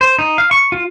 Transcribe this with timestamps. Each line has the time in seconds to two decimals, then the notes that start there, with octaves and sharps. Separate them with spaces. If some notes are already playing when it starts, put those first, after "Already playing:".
0.01 C5
0.19 D#4
0.38 F5
0.51 C#6
0.72 F4